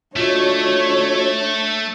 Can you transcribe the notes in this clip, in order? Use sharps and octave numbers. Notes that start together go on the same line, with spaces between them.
A3 D4 F4 F#4 C#5 D#5